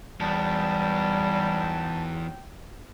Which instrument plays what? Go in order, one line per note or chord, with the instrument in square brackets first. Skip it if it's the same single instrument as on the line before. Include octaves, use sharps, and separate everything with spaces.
[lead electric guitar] E2 [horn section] G#2 F#3 G5 [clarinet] G3 [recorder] A5